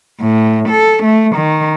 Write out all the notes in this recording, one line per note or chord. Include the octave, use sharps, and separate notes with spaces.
A2
A4
A3
D#3